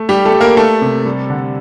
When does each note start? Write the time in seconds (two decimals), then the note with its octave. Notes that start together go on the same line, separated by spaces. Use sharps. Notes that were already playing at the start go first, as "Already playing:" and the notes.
Already playing: A3
0.09 G3 G4
0.25 A3 A4
0.32 G3
0.40 A#3 A#4
0.57 A3 A4
0.81 C3
1.05 G3
1.30 D3